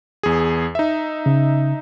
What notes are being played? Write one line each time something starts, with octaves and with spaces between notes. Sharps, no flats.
E2 G#4
D#4 E5
C#3